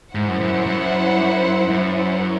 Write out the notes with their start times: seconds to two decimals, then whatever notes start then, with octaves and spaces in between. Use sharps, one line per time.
0.15 G#2 E4 C5 F#5
0.29 F#2
0.41 F#2
0.54 F#2
0.67 F#2
1.70 F#2